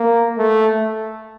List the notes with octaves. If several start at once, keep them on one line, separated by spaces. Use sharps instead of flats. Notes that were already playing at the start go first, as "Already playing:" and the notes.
Already playing: A#3
A3